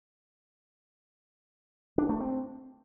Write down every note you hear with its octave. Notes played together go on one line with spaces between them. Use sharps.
D4
A3
C4